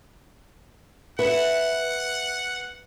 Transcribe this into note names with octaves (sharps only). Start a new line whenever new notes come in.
B4 E5 F#5